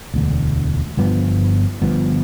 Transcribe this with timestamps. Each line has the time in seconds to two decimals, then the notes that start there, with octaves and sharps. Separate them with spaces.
0.14 E1 D2 D3
0.97 G1 G2 F3 B3
1.82 G1 G2 F3 B3